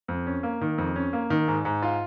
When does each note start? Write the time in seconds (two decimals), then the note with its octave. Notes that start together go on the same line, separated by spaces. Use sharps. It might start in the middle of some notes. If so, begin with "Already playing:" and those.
0.08 F2
0.27 C#4
0.43 A#3
0.61 D#3
0.78 F2
0.96 C#4
1.13 A#3
1.30 D#3
1.48 G#2
1.65 G#2
1.82 F4